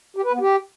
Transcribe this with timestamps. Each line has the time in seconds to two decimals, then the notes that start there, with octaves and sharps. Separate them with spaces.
0.17 G4
0.25 B4
0.33 B3
0.41 G4